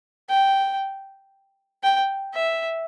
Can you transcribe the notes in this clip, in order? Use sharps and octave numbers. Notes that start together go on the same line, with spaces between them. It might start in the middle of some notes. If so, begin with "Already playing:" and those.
G5
G5
E5